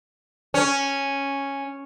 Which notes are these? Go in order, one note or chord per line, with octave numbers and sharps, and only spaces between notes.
C#4